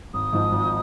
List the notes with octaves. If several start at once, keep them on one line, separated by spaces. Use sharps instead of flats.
G#1 D#6
G#2 F3
G#1